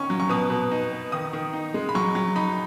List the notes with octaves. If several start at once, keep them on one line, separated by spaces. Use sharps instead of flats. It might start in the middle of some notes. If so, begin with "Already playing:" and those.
Already playing: D#3 C#4 C#6
F#3
C#6
B2 D#6
B2
D#4
B3
D#3 D#6
D#3
D#4
G#3
B5
F#3 C#6
F#3
D#4 B5